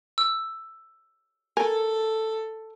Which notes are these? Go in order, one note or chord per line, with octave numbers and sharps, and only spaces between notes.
E6
A4 A#4 G#5